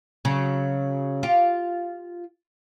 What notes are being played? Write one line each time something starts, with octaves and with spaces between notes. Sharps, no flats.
C#3 F#3
F4 G4